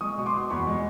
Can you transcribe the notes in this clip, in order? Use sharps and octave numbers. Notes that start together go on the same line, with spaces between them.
G#3 C#6 D#6
B2 C#6
C6 D6
B2
E2 B5 C#6
G#3